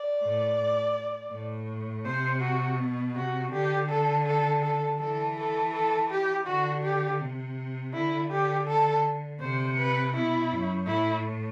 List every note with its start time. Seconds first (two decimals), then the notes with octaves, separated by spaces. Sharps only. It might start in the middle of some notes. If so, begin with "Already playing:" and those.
Already playing: D5
0.23 A2
1.32 A2
2.06 C3 C5
2.42 F#4
2.79 B2
3.16 C3 F#4
3.53 D3 G4
3.89 A4
4.27 A4
4.63 A4
4.99 E3 A4
5.37 A4
5.74 A4
6.10 G4
6.47 D3 F#4
6.83 G4
7.21 C3
7.94 D3 E4
8.31 G4
8.68 A4
9.40 C3 C5
9.78 B4
10.14 B2 E4
10.51 F#2
10.87 A2 E4